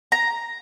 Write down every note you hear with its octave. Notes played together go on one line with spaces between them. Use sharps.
A#5